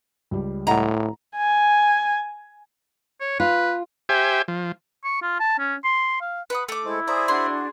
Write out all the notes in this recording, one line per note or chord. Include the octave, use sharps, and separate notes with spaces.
C#2 G3
A2 D#5 F#5 A#5
G#5
C#5
F4 B4
G4 C5 E5 G5 G#5
F3
C#6
F4
A5
C#4
C6
F5
B4 F#5 D#6
A3 D6
G#3 E4 C5
G#4 C5 D5 E5 A#5 D#6
D4 F#4 G#4 C6